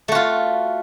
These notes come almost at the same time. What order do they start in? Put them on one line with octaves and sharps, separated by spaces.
A3 F#4 F4